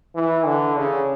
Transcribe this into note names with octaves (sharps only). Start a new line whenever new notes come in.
E3
D3
C#3